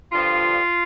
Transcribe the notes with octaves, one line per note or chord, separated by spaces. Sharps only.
G2 D3 F3 F4